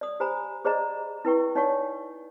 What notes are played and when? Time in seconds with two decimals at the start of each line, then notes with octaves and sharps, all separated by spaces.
0.01 D5 D#6
0.20 G4 C5 G#5 A#5 B5
0.65 G#4 C5 D5 D#5 A#5
1.25 E4 B4 G5 C#6
1.55 D#4 C#5 D5 F#5 G#5 C#6